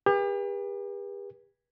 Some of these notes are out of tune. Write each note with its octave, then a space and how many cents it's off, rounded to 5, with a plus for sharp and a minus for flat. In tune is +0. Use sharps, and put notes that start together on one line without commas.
G4 +40 B4 -35